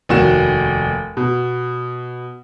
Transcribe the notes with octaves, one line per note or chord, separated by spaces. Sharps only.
F1 D#2 F#4 E7
B2